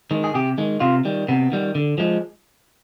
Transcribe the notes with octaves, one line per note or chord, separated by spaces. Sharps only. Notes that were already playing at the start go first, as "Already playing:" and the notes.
D#3 G#3
G#4
C3 G4
D#3 G#3
C3 F4
D#3 G3
C3 B3
D#3 G3
D3
F3 G#3